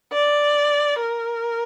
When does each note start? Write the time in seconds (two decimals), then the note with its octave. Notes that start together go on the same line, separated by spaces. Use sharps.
0.13 D5
1.00 A#4